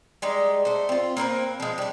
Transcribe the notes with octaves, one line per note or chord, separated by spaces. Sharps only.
G3 G#3 D#4
A3 C5
C4 F4
A#3 C4 A#4 B4
F3 G#3
G3 D4